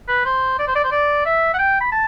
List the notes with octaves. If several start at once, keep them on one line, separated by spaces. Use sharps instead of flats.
B4
C5
D5
C5
D5
C5
D5
E5
F#5
G5
B5
A5